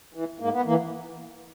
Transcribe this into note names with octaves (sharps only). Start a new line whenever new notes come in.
E3
G#2 A#3
B3
E3 A#3